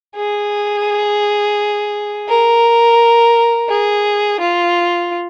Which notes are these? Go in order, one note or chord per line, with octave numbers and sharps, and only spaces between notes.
G#4
A#4
G#4
F4